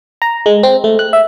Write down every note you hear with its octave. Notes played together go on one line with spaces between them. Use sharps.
A#5
G#3
C4
A3
F#6
E5